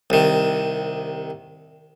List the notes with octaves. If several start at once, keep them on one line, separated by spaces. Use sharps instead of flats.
C2 D#3